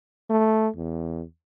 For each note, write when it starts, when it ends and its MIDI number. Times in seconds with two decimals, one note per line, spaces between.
0.30 0.68 57
0.76 1.23 40